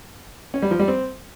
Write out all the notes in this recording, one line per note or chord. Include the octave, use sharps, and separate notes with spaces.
C#4
G3
F3
G3
C4